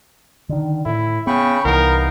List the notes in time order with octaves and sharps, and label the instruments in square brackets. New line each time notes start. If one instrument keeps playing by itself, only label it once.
[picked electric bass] D3 D#3
[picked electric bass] A2 [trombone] E4
[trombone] C#3 [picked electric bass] B3 [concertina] G5 B5 C#6
[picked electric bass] C2 E3 [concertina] B3 D#4 F5 [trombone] A#4